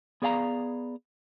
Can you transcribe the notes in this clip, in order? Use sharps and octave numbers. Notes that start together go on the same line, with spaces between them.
B3 G#4 D5 F5 F#5 A#5